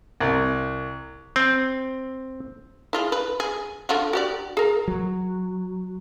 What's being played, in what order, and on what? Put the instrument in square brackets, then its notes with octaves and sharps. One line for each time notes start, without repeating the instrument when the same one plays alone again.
[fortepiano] C2
[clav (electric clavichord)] C4
[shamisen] E4 F4 G#4
B4
G#4
D3 F4 F#4
F#4 G4 D5
G#4 A#4
[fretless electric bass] F#3